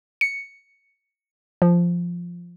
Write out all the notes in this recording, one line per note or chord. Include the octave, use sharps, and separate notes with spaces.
C#7
F3